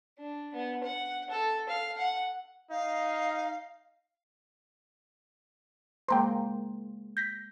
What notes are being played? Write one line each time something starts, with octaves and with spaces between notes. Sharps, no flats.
D4
B3
F#5
A4
F5
F#5
D#4 F5
G#3 A#3 C5 G5 A#5 C6
G6 A#6 B6